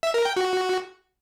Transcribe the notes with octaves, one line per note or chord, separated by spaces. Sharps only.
E5
A#4
G5
F#4